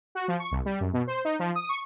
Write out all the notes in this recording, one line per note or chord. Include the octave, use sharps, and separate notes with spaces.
F#4
F3
C#6
C2
G3
F#2
B2
C5
D#4
F3
D#6
C#6